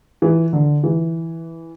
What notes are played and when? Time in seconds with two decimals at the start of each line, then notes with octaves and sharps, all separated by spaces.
0.22 E3
0.53 D3
0.83 E3